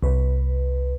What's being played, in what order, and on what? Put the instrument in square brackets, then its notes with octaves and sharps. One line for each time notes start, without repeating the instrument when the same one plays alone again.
[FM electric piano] C2 B4